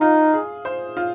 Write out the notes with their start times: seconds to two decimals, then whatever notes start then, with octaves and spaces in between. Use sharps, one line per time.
0.01 D#4 F4
0.33 G#4
0.65 C5
0.97 F4